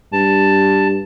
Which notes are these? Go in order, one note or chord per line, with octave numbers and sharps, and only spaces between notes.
G2 A5